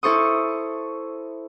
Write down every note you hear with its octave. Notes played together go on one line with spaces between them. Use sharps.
E4 A4 C5 C#6 D#6